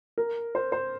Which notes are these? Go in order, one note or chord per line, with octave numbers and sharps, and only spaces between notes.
A#4
C5
C5